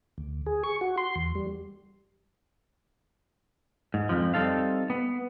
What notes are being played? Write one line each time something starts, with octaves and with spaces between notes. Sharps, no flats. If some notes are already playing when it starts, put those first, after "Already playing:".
D2
G#4
C#6
F#4
C6
E2
G3
G#2
F2 F3
G3 C4 D#4 A4 F5
B3